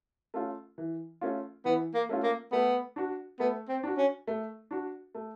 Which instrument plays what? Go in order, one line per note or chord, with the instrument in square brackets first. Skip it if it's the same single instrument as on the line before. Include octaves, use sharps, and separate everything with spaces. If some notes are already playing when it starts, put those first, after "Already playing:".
[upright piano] A3 C#4 F4
E3
A3 C#4 F4
[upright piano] E3 [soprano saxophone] B3
[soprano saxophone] A#3
[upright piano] A3 C#4 F4
[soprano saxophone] A#3
[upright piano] A3 [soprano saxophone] B3
[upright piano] D4 F#4
[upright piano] A3 [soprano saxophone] B3
[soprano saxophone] C4
[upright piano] D4 F#4
[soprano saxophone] C#4
[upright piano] A3
D4 F#4
A3